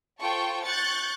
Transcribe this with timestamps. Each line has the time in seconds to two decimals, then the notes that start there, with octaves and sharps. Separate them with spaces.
0.20 F4 A4 C5 G5 A5 C#6
0.64 C#6 F#6 G6 A6 C#7